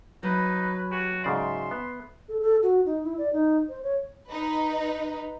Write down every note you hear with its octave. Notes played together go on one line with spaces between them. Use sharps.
F#3 D#4 B4
F#4 G4 G#5
G#2 C#3 D5 E5 C6
B3
A4
A4
F#4
D#4
E4
D5
D#4
C5
C#5
D#4 B4